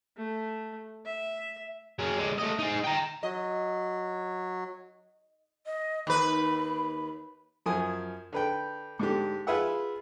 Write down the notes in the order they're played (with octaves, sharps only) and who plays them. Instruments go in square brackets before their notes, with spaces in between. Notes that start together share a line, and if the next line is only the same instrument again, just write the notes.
[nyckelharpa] A3
E5
[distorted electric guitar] F#3 G#4
D3 G#3
A3 D#5
D#4 G#4
G5 A#5
[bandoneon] F#3 [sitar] D#5
[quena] D#5
[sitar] D#2 B4 [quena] B5
[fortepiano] F#2 F3 G#5 D#6
D3 B4 G5
G#2 D3 G4
F4 G#4 B4 E5 F#5